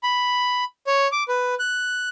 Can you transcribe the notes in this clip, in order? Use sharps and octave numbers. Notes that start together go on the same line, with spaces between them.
B5
C#5
D6
B4
F#6